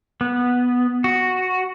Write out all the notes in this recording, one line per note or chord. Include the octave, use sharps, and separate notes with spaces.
B3
F#4